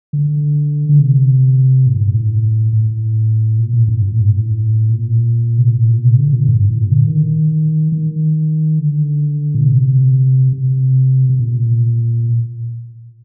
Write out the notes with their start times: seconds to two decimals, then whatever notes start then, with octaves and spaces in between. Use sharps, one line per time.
0.13 D3
0.89 D3
0.99 C3
1.86 A2
1.96 G2
2.05 A2
2.73 A2
3.58 A#2
3.73 A#2
3.84 A2
3.88 G2
4.02 A#2
4.11 A2
4.19 G2
4.28 A2
4.89 A#2
5.58 C3
5.67 A#2
5.75 A2
5.90 A#2
6.05 C3
6.19 D3
6.33 A#2
6.48 G2
6.63 A2
6.77 A#2
6.91 D3
7.06 D#3
7.92 D#3
8.79 D3
9.54 A#2
9.66 C3
10.53 C3
11.29 C3
11.39 A#2